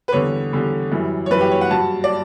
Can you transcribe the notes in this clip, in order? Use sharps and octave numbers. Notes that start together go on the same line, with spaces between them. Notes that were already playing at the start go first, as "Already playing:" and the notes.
B4
E2 D3 G3 C#5
E2 D3 G3
F#2 E3 G3
C#5
F#2 E3 G3 B4
G4
C#5
F#5
G2 F#3 A5
D5